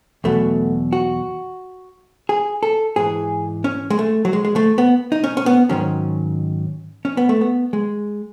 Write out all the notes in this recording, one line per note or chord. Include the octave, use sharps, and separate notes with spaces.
E2 B2 F#3 A3
F#4
G#4
A4
G#2 E3 G#4
C#4
G#3
A3
F#3
G#3
G#3
A3
B3
D#4
C#4
C#4
B3
G#2 D#3 F#3 C#4
C#4
B3
A3
B3
G#3